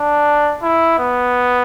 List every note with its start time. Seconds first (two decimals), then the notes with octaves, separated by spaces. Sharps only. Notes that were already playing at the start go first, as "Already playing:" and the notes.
Already playing: D4
0.62 E4
0.99 B3